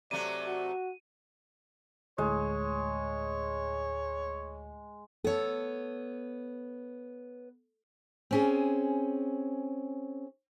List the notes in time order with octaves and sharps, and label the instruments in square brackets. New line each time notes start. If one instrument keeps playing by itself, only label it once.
[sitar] C3 F#3 A3 [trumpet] D5 [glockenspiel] D#7
[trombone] F#4
[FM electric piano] D2 A2 [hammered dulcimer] G#3 [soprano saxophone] C#5
[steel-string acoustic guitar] B3 C#5 [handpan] A4
[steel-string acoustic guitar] C4 C#4 G#4